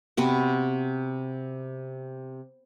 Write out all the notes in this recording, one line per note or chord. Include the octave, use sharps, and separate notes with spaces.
C3 B3 F#4